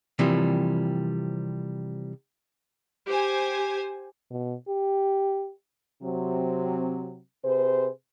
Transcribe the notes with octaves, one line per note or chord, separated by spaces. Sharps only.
C3 E3 F3 G3 A#3
G4 C5 G#5
B2
G4
C3 F#3 C4
C3 G#4 B4 C5